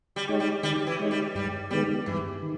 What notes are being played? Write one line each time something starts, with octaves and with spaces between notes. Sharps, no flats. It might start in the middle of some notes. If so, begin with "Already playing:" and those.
G3
G#3 D#4 G4 C#5
G3
D#3 G3
E3
G#3 D#4 G4 C#5
G3
G2 G3
D#3 G3 G#3 B3
G2 E3
D#3